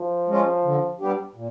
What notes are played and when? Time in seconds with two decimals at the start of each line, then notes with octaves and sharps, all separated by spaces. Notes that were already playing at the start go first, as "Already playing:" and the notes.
Already playing: F3
0.28 G#3 C#4 F4
0.64 D3
1.00 G3 B3 D4 G4
1.35 A#2